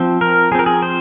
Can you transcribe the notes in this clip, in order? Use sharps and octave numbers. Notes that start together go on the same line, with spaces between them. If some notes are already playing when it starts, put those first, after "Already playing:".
Already playing: F3 C4
A#4
F3 C4 G#4 A#4
G#4
C5